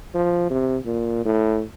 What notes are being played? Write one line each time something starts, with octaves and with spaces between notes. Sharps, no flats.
F3
C3
A#2
A2